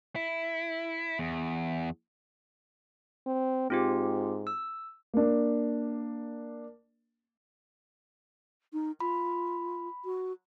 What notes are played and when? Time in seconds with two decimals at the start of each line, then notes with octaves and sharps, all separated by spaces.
0.16 E4
1.19 E2
3.26 C4
3.70 G#2 C4 F4 G4
4.47 E6
5.14 A#3 D4
8.73 D#4
9.00 F4 B5
10.05 F#4